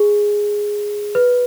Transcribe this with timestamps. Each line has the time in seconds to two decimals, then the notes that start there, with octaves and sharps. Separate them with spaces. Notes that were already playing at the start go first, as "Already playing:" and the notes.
Already playing: G#4
1.15 B4